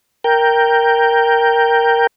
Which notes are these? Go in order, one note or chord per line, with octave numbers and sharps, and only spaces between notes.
A#4 G5